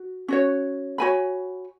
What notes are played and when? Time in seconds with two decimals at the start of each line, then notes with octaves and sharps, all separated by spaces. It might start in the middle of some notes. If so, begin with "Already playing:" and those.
Already playing: F#4
0.28 C#4 F#4 C#5
0.98 F#4 C#5 G#5 B5